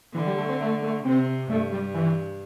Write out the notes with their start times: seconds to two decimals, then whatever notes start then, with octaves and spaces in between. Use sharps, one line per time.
0.14 D3 E3
0.26 G3
0.38 A3
0.49 C4
0.60 A3
0.82 A3
1.04 C3 C4
1.49 G2 A3
1.72 G3
1.94 E3